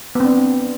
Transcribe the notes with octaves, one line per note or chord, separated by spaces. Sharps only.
B3 C4 D4